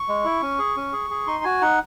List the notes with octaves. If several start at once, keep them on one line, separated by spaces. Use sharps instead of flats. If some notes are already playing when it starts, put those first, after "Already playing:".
Already playing: C#6
G#3
E4
C#4
G#4
C#4
G#4
G#4
D#4 C6
F#4 G#5
D#4 F#5